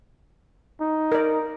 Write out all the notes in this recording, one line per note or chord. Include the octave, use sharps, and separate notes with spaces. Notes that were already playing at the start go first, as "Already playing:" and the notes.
D#4
A#4 D5